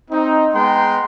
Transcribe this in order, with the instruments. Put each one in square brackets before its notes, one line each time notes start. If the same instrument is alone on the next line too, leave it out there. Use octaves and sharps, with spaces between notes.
[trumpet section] C4 D#4
G#3 B3 G5 A#5 C6